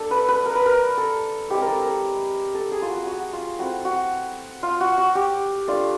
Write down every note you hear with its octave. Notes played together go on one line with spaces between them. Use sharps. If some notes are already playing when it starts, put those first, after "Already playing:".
Already playing: A#3 D4 A4
B4
B4
A#4
B4
A#4
A4
G#3 C4 E4 G4
A#4
A4
A#4
A4
G#4
F4
F#4
F#4
F4
A3 C4 E4 F#4
F#4
F4
F#4
F#4
G4
A3 D4 F4